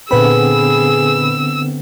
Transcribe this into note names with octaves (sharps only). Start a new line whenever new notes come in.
A#2 D3 B3 C4 G#4 B4 B5 E6